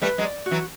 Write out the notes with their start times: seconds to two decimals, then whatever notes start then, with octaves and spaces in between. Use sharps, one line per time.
0.02 G3 A3 B4
0.18 F#3 G#3
0.24 D5
0.46 F#4
0.51 E3 F#3